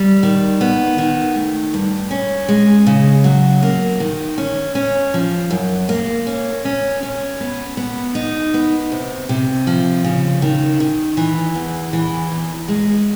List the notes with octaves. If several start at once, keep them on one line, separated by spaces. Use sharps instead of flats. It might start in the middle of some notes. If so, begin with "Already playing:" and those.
Already playing: G3
D#3
B3
D#3
A3
G2
C#4
G#3
C#3
F#3
A#3
D#3
C#4
C#4
F3
F#2
A#3
C#4
C#4
C#4
B3
B3
D#4
B3
C3
C3
F3
C#3
D#3
D#3
E3
E2
E3
E2
G#3